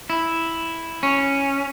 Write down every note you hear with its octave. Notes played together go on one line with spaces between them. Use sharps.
E4
C#4